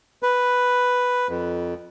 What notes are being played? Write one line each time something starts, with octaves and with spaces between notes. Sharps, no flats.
B4
F2